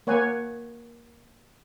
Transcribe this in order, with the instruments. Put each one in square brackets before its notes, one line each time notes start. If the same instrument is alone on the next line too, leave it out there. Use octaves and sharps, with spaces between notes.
[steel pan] A#3 C#5 F#5 G#5